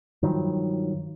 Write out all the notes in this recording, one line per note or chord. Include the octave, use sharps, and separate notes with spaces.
G2 D#3 F3 F#3